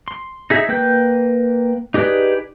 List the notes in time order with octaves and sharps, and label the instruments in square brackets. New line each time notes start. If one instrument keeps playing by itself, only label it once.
[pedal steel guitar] C6
D#4 G#4 E5
A#3 B4 G5 G6
D#4 G4 G#4 B4 D5